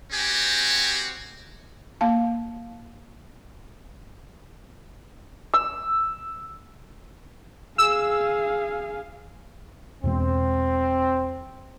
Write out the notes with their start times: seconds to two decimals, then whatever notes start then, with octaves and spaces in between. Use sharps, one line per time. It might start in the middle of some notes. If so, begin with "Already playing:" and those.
0.13 C4 F#4 G4 G#5
2.01 A#3 F5 A5
5.54 E6
7.78 G#4 F5 E6
10.04 E2 B2 G#3 C4